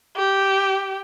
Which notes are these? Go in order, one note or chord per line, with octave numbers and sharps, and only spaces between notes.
G4